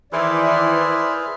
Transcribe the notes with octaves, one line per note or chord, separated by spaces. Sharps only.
D#3 E3 E4 G#4 B4 C5 D5 F6